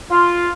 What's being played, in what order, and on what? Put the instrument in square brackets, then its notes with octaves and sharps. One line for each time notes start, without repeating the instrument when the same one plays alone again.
[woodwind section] F4